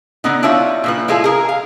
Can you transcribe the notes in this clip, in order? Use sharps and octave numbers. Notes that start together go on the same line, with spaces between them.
D3 B3 D#4
G3 D4 E4 F4 C#5 E5
A#2 F3 B4
G#3 E4 F4 G#4 A4
G#4 A#4
F5